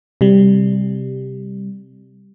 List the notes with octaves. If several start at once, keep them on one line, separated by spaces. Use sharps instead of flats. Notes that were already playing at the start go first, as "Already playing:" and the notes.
C3 G3